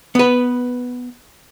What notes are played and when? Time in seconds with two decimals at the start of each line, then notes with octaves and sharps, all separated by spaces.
0.15 B3 B4